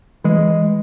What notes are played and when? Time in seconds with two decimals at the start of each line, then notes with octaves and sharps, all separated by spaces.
0.24 E3 G#3